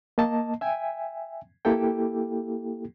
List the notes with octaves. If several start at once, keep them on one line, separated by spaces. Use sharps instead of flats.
A#3 D#5 A5
E5 G5 G#5
A#3 E4 G4 A4 G5